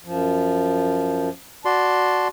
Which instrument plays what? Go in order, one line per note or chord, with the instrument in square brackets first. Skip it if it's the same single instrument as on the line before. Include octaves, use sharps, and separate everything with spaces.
[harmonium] F#2 F3
[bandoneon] F#4 D5 C6 [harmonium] A5